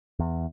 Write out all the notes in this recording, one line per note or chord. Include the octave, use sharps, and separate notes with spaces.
E2